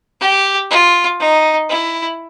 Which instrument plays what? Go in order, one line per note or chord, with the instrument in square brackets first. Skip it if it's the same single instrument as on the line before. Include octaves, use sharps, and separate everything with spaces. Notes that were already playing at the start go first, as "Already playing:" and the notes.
[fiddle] G4
F4
D#4
E4